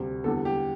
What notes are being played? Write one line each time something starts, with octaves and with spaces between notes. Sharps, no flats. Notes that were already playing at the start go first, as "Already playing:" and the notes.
Already playing: D2 C3 G3
E2 D3 G3 A4
G4